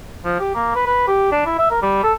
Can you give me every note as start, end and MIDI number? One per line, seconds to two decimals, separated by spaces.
0.25 0.37 53
0.40 0.53 67
0.55 0.72 58
0.75 0.83 71
0.86 1.05 71
1.07 1.30 67
1.32 1.43 62
1.46 1.55 64
1.59 1.66 76
1.70 1.79 70
1.82 2.02 55
2.03 2.13 69